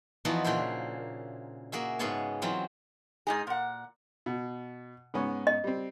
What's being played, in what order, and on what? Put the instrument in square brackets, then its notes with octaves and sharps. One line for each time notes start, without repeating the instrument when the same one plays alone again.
[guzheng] E2 E3 F3 B3 D#4 F#4
A#2 C#3 D4 E4 C5
A#3 F#4 G#4 E5
G#2 C#3 B3 G#4 C#5 A5
E3 F#3 C4 F4
[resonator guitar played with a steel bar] G#2 D#4 G#4
A#2 F#5
[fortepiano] B2
G#2 B3 C#4
[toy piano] D#5
[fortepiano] G3 C4